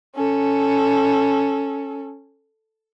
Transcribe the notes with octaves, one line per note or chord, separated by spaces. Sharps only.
C#4 A4